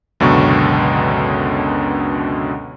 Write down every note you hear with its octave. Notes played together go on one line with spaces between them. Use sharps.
C#2 F#2 B2 D3 C#6